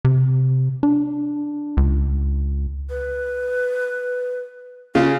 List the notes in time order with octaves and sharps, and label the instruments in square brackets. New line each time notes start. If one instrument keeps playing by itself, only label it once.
[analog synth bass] C3
D4
C#2
[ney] B4
[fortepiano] C#3 F4 [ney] C#4